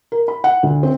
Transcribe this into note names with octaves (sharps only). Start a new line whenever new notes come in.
A#4
B5
F#5
D2
C4